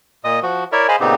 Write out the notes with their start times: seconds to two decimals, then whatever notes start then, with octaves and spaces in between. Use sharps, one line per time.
0.24 A#2 D#5 D#6
0.43 F3 F#4
0.72 E4 A#4 C#5 D5 E5
0.88 G#4 C5 D#5 F5 G#5 B5
1.00 A#2 C#3 B3 C4 D#4 G4